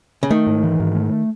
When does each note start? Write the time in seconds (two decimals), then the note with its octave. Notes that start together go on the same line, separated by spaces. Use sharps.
0.23 C#3
0.30 D#3 A3
0.47 G#2
0.64 E3
0.80 G#2
0.95 A3